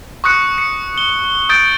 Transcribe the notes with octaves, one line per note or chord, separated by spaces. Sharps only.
C#6 D#6 F#6 C#7
C#7
G7
D#6 G6 A6 D7